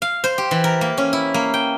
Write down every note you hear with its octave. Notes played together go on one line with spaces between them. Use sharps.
F5
C5
G4
E3
A#4
A#3
C#4
E4
A#3
G5